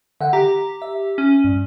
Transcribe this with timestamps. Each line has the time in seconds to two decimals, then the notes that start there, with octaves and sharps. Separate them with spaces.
0.21 D3 E5 F#5 G5
0.33 G4 A#5
0.82 E5
1.18 C#4
1.44 G2